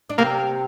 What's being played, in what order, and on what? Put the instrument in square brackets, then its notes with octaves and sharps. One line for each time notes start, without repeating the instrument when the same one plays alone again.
[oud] D4
[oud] C3 C4 [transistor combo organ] A#3